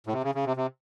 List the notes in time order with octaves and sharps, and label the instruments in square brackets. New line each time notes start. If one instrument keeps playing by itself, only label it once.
[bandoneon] A2
C3
C#3
C#3
C3
C3